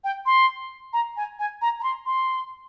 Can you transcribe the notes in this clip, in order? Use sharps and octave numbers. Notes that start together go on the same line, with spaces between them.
G5
C6
A#5
G#5
G#5
A#5
A#5
C6
C6